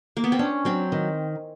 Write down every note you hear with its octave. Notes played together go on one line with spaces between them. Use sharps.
A#3
B3
C4
C#4 D4
F#3 C4
D#3